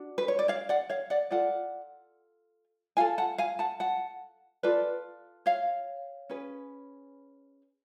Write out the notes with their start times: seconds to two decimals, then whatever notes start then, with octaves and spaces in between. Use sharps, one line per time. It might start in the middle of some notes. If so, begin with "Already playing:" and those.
Already playing: D4 F#4
0.18 B4
0.28 C#5
0.39 D5
0.48 C#5 F5
0.69 D5 F#5
0.90 C#5 F5
1.10 D5 F#5
1.30 F4 A4 D5 F#5
2.97 F4 A4 F5 G#5
3.18 F#5 A5
3.38 F5 G#5
3.59 F#5 A5
3.80 F#5 A5
4.63 F4 A4 B4 D5
5.46 C#5 F5
6.30 C#4 G#4 B4